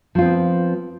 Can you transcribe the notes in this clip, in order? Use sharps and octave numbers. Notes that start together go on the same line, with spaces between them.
F3 B3 C4 F4